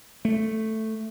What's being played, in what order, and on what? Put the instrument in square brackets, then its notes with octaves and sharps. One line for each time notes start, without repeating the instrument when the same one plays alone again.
[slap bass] A3